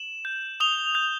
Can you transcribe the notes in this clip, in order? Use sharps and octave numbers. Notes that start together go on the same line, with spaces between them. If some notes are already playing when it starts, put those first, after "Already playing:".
Already playing: E7 F#7
G6
D#6 F7 G7
G6